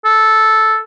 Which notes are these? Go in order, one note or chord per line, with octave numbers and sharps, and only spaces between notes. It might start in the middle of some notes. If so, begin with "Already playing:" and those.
A4